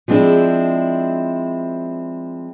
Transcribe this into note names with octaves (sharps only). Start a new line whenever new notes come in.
F3 G#3 C4 D4 E4